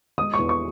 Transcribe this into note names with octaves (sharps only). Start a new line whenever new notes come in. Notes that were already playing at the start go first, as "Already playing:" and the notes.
G#3 D#6
C#6
E2
C#6